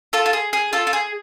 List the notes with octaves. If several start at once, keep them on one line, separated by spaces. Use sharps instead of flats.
F4 A4
F4
G#4
G#4
F4 A4
F4
G#4